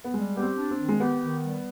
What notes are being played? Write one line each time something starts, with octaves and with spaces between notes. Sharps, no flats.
B3
G3 G#3
B3 G4
C4
D4
C4
D#3
G#3
B3 G4
D#3
G3